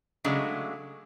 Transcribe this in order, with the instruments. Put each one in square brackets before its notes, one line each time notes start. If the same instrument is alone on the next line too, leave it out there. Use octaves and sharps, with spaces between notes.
[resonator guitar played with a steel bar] C#3 F#3 G#3 A3 D4